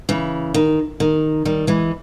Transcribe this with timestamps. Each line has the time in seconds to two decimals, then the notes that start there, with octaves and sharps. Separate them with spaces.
0.09 C#3 E3
0.54 D#3
1.00 D#3
1.45 D#3 G3
1.67 E3 G#3